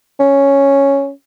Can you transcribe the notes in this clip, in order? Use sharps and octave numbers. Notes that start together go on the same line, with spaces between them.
C#4